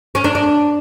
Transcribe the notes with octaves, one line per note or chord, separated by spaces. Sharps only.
C#4
D4
D4